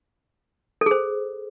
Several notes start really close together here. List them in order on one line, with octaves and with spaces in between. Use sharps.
A4 G#4 C5